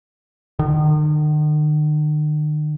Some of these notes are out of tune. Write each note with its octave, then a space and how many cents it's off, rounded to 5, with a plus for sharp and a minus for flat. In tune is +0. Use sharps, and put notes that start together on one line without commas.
D#3 -45